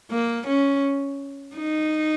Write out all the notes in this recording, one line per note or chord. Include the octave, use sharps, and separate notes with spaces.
A#3
C#4
D#4